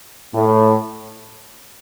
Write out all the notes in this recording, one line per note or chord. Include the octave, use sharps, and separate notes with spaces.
A2